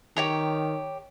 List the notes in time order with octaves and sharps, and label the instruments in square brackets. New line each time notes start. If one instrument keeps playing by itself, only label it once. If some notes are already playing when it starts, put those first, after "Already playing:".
[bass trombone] D#3 [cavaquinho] G4 C#5 A#5